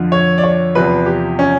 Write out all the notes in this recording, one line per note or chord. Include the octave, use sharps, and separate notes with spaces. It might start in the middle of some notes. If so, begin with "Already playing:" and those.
Already playing: F2 D3 F3
C#5
D5
C#5
E2 C3 F3 B4
G4
C#4